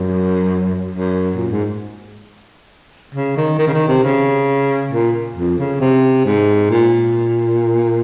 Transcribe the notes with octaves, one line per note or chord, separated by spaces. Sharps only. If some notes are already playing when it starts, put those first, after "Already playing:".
Already playing: F#2
F#2
A#2
G#2
C#3
D#3
D#3
C#3
D#3
C3
C#3
A#2
F2
C#3
C3
G#2
A#2